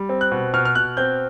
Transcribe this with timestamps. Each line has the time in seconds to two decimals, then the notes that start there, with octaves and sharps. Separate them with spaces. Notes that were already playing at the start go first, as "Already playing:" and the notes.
Already playing: G3
0.09 C4
0.21 F#6
0.31 B2
0.53 B2 F6
0.65 F6
0.75 B2 F#6
0.97 C4 G6